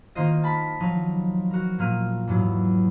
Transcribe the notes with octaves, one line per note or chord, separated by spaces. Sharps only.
D#3 A#3 F4 C5 D#5
A5 B5
F3 F#3 D#4
F#4 A#4
A#2 A#3 F6 D#7
E2 G#2 F#3